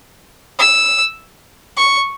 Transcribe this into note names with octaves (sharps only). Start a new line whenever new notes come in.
E6
C#6